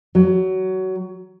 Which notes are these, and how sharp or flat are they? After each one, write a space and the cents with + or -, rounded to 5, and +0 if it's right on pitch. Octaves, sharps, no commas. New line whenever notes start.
F#3 +20